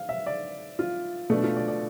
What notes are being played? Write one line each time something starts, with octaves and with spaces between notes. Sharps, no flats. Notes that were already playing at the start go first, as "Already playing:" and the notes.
Already playing: F5
E5
D5
F4
B2 A3 D4
F4
D5
D5